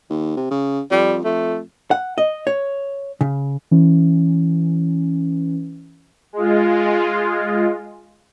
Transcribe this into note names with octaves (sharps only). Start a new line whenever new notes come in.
D#2
C3
C#3
F2 G3
F2 A3
F#5
D#5
C#5
C#3
E3 C#4
G#3 F4